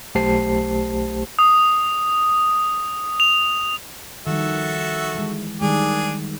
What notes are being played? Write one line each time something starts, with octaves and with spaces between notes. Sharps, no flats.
B1 A3 G4 C5 A5 C7
D#6
F7
D#3 F3 G3 F#4 A4 E5
E3 G#3
D#3 G3 G#3 D4 G#4 D6